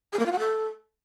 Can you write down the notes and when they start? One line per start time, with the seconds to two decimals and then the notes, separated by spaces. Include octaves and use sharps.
0.13 G#4
0.19 A#3
0.26 F4
0.32 F#4
0.39 A4